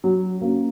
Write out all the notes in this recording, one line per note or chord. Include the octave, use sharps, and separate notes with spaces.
F#3
A#3 C#4